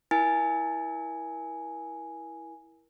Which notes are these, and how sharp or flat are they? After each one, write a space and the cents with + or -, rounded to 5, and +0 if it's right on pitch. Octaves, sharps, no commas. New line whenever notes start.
E4 +0 A#4 +25 G#5 +0